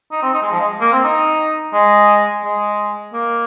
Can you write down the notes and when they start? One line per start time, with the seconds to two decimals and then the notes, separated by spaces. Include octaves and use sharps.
0.12 D#4
0.23 C4
0.34 D#4
0.42 G#3
0.52 F3
0.60 G#3
0.81 A#3
0.92 C4
1.04 D#4
1.74 G#3
2.44 G#3
3.13 A#3